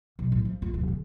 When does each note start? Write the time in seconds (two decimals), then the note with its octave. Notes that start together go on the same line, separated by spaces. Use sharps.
0.19 B1
0.32 A2
0.45 F3
0.62 F4
0.74 D1
0.88 D3